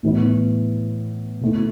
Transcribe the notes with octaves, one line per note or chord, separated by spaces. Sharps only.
A2 E3 B3 E4
B2 A3 E4